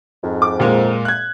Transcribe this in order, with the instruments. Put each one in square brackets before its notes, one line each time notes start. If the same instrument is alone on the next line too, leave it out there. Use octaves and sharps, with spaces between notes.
[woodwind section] F2 G#2
[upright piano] D6
A#2 G#3 A#3
F#6 G#6